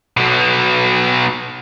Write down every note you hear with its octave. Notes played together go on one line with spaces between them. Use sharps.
B1 B2